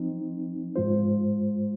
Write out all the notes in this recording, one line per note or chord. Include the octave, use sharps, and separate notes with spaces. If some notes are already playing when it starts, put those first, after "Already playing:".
Already playing: F3 C4 D#4
G#2 G#3 F4 C5